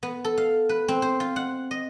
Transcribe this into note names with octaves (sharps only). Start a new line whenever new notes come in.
B3
A4
F5
B4
C4
C5
F4
F#5
D#5